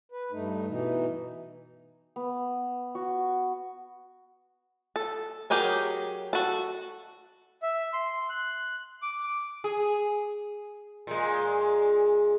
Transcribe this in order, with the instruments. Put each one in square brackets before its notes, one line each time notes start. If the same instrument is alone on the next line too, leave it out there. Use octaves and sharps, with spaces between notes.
[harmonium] B4
G2 A3 D#4
B2 E3 D#4
[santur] B3
F#4
[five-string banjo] A4
F#3 G4 G#4 A#4 C#5
F#4 A4
[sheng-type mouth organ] E5
C6
F#6
D6
[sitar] G#4
A#2 G#3